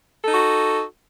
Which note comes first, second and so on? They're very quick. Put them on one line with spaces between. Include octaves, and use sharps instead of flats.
A4 D#4 F#4